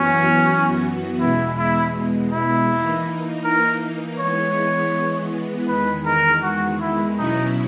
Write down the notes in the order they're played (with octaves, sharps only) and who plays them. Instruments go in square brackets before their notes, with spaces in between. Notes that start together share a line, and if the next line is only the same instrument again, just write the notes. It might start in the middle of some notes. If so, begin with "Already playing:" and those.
Already playing: [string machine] F#2 E3 B3 F#4 [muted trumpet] C#4
[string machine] E2 B2 G#3 [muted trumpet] E4
[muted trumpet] E4
E4
[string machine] E3 A#3 D#4
[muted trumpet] A#4
[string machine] E3 G#3 B3 [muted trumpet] C#5
[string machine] E2 D#3 G#3 [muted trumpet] B4
[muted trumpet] A#4
F#4
E4
[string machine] B2 F#3 C#4 E4 [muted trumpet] D#4